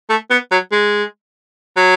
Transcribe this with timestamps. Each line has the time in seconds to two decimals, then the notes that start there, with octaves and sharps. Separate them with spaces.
0.10 A3
0.31 B3
0.51 F#3
0.72 G#3
1.77 F#3